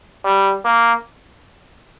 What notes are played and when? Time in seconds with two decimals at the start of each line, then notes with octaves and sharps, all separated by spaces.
0.25 G3
0.65 A#3